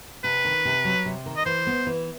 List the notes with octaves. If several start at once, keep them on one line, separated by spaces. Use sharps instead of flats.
C3 B4
D#3
C3
F#3
C3
D#3
D#5
E3 C5
B3
E3